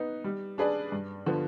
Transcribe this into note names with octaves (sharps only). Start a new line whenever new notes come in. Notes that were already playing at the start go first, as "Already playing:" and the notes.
Already playing: B3 D#4
G3
D4 G#4 B4 D5
G2
D3 F3 B3